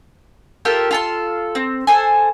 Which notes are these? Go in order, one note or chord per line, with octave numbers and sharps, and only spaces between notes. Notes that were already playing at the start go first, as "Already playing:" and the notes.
F4 G4 A4 A#4
F4 A4 C6
C4
A4 C5 G#5